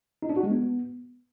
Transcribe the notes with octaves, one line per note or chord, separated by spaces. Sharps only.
D#4
D4
F#4
G#3
B3